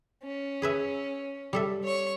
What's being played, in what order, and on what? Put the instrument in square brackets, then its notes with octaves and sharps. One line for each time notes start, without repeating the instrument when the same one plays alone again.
[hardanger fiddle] C#4
[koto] G#4 B4 E5
G3 A4 E5
[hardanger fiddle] C#5 C#6